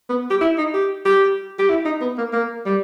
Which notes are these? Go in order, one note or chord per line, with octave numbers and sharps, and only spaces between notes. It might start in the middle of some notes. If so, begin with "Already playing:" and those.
B3
G4
E4
D#4
G4
G4
G4
E4
D#4
B3
A#3
A#3
G3